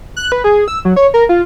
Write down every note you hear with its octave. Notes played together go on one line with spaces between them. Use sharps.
F#6
B4
G#4
E6
F#3
C#5
A#4
F4